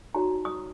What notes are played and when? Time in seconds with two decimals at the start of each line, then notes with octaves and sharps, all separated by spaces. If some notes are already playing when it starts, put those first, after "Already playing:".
0.15 D#4 F#4 C#5 A#5
0.45 D#6